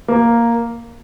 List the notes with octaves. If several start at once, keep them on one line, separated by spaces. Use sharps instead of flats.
A#3